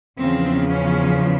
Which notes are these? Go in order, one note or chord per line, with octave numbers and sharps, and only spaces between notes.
E2 C#3 F3 C4
C#4